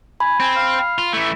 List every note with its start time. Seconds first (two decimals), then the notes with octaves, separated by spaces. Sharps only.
0.20 G#5 B5
0.40 C4 G#5
0.56 F5
0.98 F4
1.13 E3 A3 E4